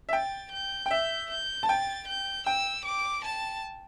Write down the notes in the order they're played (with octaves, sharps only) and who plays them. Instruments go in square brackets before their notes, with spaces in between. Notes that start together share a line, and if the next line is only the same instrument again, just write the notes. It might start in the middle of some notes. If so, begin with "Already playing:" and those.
[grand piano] E5
[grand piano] G5 [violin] A6
[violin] G6
[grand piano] G5
[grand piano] E5 [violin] G6
[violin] G6
[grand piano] A5
[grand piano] G5 [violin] A6
[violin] G6
[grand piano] G5 [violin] E6
[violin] D6
A5